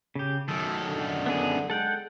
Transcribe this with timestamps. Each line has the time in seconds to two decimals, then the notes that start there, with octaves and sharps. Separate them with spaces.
0.15 C#3 G4
0.48 F#2 D#3 A4
0.88 D3
1.26 B3 D4 G#4
1.70 G#3 A4 F#5 G5